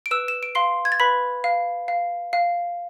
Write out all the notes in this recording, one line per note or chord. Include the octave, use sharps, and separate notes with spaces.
D7
B4 E6 E7
E7
D7
F5 C6 C7
G#6
A6
B4 B5 B6
F5
F5
F5